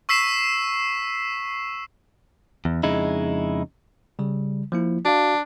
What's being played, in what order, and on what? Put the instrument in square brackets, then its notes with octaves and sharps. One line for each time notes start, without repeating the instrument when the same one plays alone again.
[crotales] C#6 E6 B6 C7 E7
[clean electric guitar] E2
F2 C#3 G#3 D#4 E4
[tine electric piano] C#3 G3
F3 A#3 E4
[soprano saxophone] D4 [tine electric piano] F#4 F5